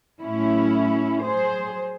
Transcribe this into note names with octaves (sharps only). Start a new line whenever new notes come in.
A2 F#3 C#4 E4
F#3 G#4 C5